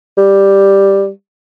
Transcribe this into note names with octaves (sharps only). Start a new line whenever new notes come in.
G3